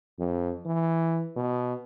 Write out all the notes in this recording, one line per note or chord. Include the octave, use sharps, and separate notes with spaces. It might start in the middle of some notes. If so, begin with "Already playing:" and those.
F2
E3
B2